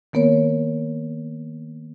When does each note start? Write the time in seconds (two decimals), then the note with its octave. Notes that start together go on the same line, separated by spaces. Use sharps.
0.13 D#3 A#3 B3 A#4 C#5